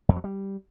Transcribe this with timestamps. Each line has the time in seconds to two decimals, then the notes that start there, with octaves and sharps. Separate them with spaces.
0.09 F2
0.16 F#3
0.24 G3